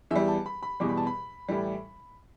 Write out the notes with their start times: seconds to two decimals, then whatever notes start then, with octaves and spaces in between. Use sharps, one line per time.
0.11 E2 E3 G3 E5
0.28 A5
0.46 B5
0.63 B5
0.80 E2 B2 G3 D6
0.89 B5
0.97 A5
1.07 B5
1.48 A2 E3 G3